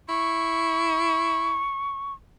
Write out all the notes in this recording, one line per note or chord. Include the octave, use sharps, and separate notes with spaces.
E4 C#6